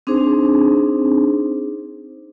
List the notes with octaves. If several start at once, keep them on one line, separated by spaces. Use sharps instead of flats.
C4 D4 D#4 G#4 C5